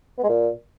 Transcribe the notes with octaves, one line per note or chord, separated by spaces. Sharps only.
B3
G#3
A#2